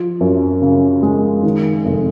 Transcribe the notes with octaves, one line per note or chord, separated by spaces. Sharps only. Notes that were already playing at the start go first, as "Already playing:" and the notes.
Already playing: F3
F#2
C#3
G#3
D#3
F1